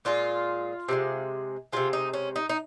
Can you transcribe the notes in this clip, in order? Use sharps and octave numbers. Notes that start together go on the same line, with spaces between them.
A#2 G#3 F4
C3 F3 G#3
C3 F3 G#3 F4
D#4
C#4
D#4
D#4